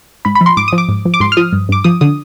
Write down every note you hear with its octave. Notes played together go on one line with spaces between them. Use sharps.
G#2 B5
B5
F3
C6
G#2 D6
D#6
F3
D6
G#2
F3
D6
G#2 C6
F6
F3 D#6
G2
G2 D6
F3 D#6
D3 D#6